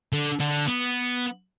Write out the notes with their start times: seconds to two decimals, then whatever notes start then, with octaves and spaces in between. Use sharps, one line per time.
0.12 D3
0.40 D3
0.67 B3